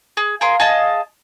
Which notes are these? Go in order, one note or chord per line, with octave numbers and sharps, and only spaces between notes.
G#4
G#4 A#4 F5 C6
G#4 D#5 A5